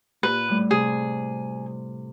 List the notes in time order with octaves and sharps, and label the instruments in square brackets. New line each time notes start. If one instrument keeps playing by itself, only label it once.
[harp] A#2 F#6 [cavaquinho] B4
[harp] A2 G3 A3
[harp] C3 [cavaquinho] G#4